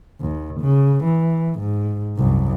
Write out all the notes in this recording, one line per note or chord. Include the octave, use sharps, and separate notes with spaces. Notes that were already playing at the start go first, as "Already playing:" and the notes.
D#2
C#3
E3
G#2
C2 F#2